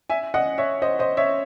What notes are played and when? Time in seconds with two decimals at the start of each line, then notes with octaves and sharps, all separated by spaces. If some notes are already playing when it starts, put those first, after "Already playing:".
0.10 E5 G#5
0.34 D#5 F#5
0.58 C#5 E5
0.82 C5 D#5
0.99 C5 D#5
1.17 C#5 E5